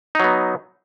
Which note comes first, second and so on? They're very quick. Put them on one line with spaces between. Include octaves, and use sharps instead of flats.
D#4 F#3 B3